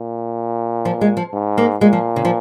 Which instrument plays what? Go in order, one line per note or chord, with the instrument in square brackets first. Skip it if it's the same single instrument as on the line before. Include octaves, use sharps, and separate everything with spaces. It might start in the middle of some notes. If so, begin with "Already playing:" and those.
Already playing: [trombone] A#2
[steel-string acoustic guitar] F3
G#3
F3
[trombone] G#2
[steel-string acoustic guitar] A#3
[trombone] A#2 [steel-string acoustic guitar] G#3
[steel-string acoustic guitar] F3
C#3
F3